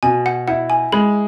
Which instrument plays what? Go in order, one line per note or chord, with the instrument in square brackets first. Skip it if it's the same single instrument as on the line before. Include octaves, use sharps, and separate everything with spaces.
[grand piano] B2 [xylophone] G#5
[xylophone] F#5
[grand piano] E4 [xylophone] F#5
[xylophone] G#5
[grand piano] G#3 [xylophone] B5